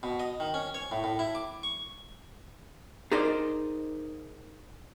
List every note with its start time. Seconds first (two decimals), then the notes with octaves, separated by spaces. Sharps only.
0.03 B2
0.20 D#5
0.40 D#3
0.54 C#4
0.74 C#5
0.92 A2
1.04 A2
1.19 E4
1.35 D6
1.63 C#6
3.12 D#4 G#4 A#4 C5 D5 D#5